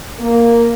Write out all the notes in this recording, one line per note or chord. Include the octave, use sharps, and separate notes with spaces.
A#3